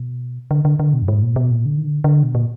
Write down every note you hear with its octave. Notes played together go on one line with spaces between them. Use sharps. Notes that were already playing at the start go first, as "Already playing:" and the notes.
Already playing: B2
D3
D3
D3
B2
F#2
G#2
A#2
B2
A#2
D3
D#3
D3
D3
B2
A#2